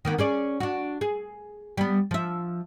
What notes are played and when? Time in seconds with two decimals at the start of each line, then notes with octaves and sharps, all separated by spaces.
0.05 D#3 A#3 B3
0.18 C#4 G#4 D5
0.60 D4 F#4
1.01 G#4
1.77 G3 B3
2.11 F3 E5